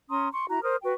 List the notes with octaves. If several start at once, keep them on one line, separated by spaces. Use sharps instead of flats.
C#4 A#5 C6 D#6
C6 C#6
E4 F#4 A#5
A#4 C5 D#6 F6
F#4 B4 G5 C#6